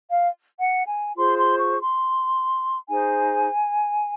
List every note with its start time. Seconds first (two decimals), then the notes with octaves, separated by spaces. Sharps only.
0.08 F5
0.59 F#5
0.87 G#5
1.16 F4 G#4 C5 C6
1.38 C6
1.59 C#6
1.81 C6
2.88 D#4 G#4 C5 G#5